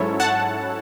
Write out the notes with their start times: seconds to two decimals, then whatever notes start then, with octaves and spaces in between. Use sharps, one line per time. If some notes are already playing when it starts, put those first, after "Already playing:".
Already playing: G#2 F#3 C#4 E4 A4 C#5
0.20 F#5 A5